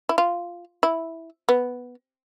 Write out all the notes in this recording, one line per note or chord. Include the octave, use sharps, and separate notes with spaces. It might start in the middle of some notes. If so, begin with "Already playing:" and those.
E4
F4
E4
B3